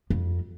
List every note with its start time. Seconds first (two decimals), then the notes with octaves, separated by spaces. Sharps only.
0.10 F2